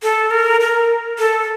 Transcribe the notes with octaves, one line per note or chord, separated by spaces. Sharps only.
A4
A#4
A#4
A4